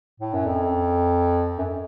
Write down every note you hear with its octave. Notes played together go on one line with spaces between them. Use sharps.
A2
F#2
F2
F#2